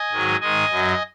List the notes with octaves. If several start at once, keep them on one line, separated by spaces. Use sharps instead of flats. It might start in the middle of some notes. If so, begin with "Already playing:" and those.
Already playing: D#5 G#5
G#2 D#3 F#3
G#2 D#3 G#3 D#5 G#5
F#2 F#3